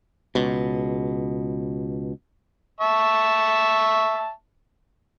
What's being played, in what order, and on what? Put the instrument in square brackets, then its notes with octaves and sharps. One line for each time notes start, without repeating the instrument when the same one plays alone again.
[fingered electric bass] C#2 B2
[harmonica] E5 A5 C#6